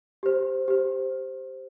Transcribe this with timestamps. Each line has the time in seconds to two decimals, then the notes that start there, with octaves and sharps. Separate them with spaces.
0.23 G4 C5
0.68 G4 C5